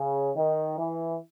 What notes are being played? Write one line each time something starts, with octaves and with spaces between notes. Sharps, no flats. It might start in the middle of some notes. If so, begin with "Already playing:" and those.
Already playing: C#3
D#3
E3